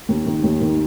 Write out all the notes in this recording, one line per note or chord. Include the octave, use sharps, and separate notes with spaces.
D#2
D#3
D#2
D#3